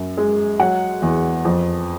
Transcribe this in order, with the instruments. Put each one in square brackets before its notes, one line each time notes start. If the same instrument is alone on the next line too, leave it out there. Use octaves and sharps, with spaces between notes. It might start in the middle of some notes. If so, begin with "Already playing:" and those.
Already playing: [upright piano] F#2
G#3
F#3 F#5
E2
F2